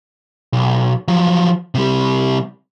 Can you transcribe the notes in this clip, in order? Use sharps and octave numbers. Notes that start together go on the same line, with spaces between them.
B1
F3 F#3
C3 G3